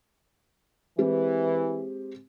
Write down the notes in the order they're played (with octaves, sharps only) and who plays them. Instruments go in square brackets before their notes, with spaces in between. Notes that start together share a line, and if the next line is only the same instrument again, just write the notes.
[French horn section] E3 [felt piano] G#3 C4 G4